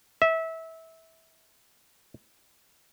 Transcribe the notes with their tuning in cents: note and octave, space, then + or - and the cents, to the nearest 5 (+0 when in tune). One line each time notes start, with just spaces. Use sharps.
E5 -20